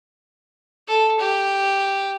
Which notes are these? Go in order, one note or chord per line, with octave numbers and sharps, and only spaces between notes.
A4
G4